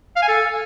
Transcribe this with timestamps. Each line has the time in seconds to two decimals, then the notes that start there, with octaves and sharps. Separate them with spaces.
0.16 F5
0.22 G#5
0.28 A4